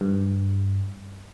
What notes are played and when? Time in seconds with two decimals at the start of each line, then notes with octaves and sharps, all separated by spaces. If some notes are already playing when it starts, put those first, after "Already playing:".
0.01 G2